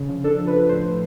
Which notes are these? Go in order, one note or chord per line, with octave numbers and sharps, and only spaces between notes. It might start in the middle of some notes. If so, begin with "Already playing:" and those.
Already playing: C#3
F3
D4 A4
F3
B4
F3
A2 C5
A2